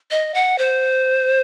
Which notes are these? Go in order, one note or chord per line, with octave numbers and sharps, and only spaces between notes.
D#5
F#5
C5